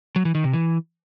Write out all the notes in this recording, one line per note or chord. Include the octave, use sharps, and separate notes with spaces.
F#3
E3
D#3
C3
E3